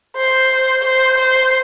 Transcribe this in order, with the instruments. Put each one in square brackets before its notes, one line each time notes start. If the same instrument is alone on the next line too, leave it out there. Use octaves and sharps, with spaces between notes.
[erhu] C5
C5
C5